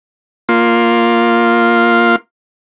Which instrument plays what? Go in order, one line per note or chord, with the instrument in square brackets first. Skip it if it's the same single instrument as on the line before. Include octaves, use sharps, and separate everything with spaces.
[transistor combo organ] A#3 F4